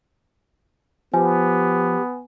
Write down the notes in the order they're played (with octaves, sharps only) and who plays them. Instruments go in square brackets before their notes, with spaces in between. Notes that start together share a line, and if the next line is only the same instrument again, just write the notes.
[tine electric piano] F3 [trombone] B3 [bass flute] G4 [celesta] G#5